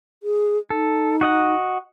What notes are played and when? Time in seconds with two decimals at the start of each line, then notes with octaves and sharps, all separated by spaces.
0.23 G#4
0.70 D#4 A4
1.21 F#4 D#5 F#5